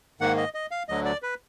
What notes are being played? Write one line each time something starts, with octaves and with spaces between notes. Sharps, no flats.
G#2 D#3 A#3 F#5
D#5
D#5
F5
D2 D3 F#3 D#5
D5
B4